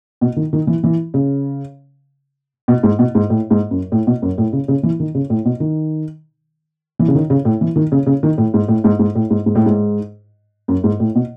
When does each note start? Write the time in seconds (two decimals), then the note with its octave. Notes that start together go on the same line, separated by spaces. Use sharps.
0.21 B2
0.36 D#3
0.53 D#3
0.67 E3
0.83 E3
1.14 C#3
2.68 B2
2.83 G#2
2.99 B2
3.15 G#2
3.30 A2
3.50 G#2
3.71 F#2
3.92 A2
4.07 B2
4.22 F#2
4.38 A2
4.53 C#3
4.68 C#3
4.83 E3
5.00 D#3
5.15 C#3
5.30 A2
5.45 B2
5.60 D#3
6.99 E3
7.08 C#3
7.15 D#3
7.30 C#3
7.45 A2
7.61 E3
7.76 D#3
7.92 C#3
8.06 C#3
8.23 D#3
8.38 A2
8.54 G#2
8.68 A2
8.84 G#2
8.99 G#2
9.15 A2
9.30 G#2
9.46 G#2
9.55 A2
9.66 G#2
10.68 F#2
10.84 G#2
11.00 A2
11.15 B2